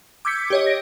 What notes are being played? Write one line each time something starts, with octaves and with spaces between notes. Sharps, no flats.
D6 E6 G6 G#6 B6 C#7
G4 C#5 D#5
A#6 D7